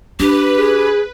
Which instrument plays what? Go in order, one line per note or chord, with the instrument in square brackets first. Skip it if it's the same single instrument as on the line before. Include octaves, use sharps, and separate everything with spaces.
[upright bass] D4 [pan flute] G4 [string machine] B4
[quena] G#4